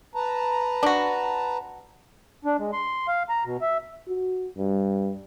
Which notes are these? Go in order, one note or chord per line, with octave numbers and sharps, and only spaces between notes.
B4 A5 A#5
D4 F#4
D4
G#3
C6
F5
A#5
B2
E5
F#4
G2